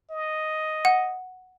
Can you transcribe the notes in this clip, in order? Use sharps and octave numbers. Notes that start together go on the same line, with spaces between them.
D#5
F#5